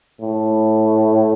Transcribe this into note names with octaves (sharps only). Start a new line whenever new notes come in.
A2